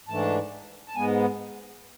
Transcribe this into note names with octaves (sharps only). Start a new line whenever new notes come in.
G#2 E3 A3 D4 A5
A5
G#2 G#3 B3 G#5